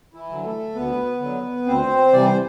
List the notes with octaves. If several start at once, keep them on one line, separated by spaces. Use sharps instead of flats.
E3 E4
D3 F#3
A3 A4
D2 B3 B4
D3 F#3
D2 C4 C5
C3 E3 G3 D5
C5